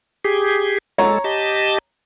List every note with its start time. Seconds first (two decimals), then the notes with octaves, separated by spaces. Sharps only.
0.25 G4 G#4
0.98 G#3 A4 C#5 A#5
1.24 G4 D#5 A5